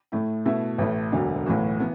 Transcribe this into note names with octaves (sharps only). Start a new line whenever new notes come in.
A2 A3 E4
B2 A3 E4 A4 E5
A1 A2 A3
E1 D2 D3 F#3
B1 A2 E3 A3 F#4
E3 B3